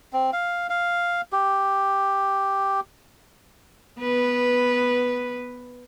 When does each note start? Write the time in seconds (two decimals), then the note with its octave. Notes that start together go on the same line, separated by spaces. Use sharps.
0.13 C4
0.33 F5
0.70 F5
1.33 G4
4.00 B3 B4